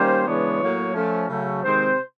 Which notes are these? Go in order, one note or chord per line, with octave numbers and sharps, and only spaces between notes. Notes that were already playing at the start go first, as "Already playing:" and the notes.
Already playing: D#3 G3 A#3 C#4 C5
C#3 E3 G#3 B3 D4 C#5
A2 F#3 A#3
F3 A3 C#4
C#3 F#3 A3
C3 D#3 G#3 C4 C5